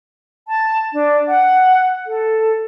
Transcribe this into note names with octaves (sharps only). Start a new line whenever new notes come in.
A5
D4
F#5
A4